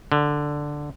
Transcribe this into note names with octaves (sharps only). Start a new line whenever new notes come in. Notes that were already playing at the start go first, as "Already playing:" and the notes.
D3